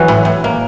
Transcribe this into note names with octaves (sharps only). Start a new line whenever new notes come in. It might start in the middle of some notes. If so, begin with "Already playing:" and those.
Already playing: E3 F#3 F#4
A2
A2
A#3